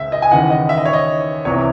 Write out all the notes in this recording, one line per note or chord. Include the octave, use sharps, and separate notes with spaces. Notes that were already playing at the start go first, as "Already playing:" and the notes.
Already playing: C#2 C#3 E5
D#5
G#5
D#2 C#3 E3 F#5
D#5
E5
D#5
C#5
D#5
C2 C3 E3 C#5